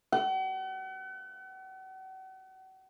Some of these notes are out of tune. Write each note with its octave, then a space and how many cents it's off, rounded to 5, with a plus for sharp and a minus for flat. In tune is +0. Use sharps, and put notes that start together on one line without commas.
F#5 +40